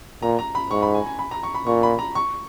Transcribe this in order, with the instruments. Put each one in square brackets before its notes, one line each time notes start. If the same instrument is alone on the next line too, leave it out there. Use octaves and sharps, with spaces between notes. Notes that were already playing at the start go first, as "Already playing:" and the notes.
[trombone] A#2 [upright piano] A#5
[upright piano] A#5
B5
[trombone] G#2 [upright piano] C#6
[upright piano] B5
G#5
G#5
B5
A#5
C#6
B5
[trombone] A#2 [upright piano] C#6
[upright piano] B5
A#5
C#6